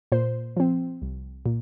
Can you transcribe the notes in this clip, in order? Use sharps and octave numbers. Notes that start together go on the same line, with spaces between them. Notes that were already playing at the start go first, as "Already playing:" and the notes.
A#2 C5
F3 C4
C2
A#2